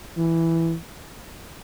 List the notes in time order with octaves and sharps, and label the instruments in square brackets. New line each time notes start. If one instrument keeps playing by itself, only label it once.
[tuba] E3